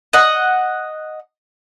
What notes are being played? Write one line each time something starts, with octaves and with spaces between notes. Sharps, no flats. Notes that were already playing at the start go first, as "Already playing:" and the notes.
D#5 F#5